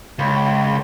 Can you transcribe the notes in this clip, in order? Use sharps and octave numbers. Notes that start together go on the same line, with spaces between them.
C#2